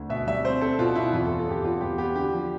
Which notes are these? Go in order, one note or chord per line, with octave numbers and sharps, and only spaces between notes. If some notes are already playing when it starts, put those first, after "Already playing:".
Already playing: D2
B2 E5
G3 E5
C4 C5
C4 A4
B2 F4
B2 E4
E2 F4
A4
B3
A4
E2 G4
B3 F4
E2 G4
B3 G4
D3 G4
F3